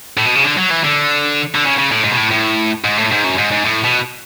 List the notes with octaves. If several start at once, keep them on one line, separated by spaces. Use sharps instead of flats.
A2
B2
C#3
D3
F#3
E3
D3
D3
C#3
C#3
A2
G#2
B2
A2
A2
G#2
A2
G#2
F#2
G#2
G#2
A2
B2